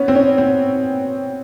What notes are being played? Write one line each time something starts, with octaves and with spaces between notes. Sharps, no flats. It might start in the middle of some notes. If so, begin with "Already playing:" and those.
Already playing: B3 C#4
C4
C#4
C4